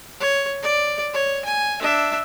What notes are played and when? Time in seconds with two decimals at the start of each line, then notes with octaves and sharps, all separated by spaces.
0.20 C#5
0.63 D5
1.13 C#5
1.45 G#5
1.81 D4 E5